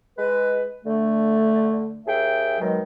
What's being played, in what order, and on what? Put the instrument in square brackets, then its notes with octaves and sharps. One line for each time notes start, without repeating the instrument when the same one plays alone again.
[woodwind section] G#3 B4
D3 A3
D#2 G#4 E5 G5
B2 D#3 F#3 G#3